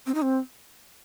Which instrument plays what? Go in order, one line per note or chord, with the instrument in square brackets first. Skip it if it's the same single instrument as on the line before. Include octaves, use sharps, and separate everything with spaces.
[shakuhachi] C4
D#4
C4